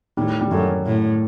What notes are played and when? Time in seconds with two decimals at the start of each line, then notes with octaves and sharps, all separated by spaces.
0.17 A2 D#3 G3
0.41 G3
0.51 F#2 F#3 A3
0.85 A2